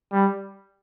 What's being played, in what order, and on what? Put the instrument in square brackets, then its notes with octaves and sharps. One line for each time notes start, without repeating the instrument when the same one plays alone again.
[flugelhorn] G3